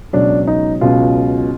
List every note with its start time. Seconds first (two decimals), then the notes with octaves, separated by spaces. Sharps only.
0.13 C#2 B2 F#3 D4
0.47 D#4
0.81 C#2 B2 F#3 F4